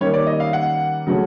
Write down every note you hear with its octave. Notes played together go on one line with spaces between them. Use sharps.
D#3 G3 A#3 C#4 C#5
D5
D#5
F5
F#5
C#3 F#3 A3 C#4